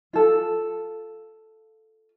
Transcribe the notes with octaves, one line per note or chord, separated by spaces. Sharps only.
F4 A4